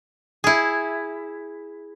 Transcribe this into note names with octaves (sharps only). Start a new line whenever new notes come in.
E4 G#4